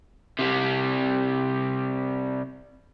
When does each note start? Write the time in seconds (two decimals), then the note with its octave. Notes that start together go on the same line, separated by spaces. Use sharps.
0.39 C3 G3